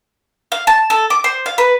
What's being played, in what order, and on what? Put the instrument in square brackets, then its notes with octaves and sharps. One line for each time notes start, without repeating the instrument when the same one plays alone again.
[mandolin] F5
A5
A4
D6
C5
F5
B4